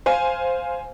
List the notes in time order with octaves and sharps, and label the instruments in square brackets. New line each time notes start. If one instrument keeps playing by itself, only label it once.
[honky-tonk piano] C5 F5 G#5